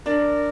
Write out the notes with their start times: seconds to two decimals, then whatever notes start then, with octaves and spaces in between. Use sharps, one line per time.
0.06 D4 A#4 D5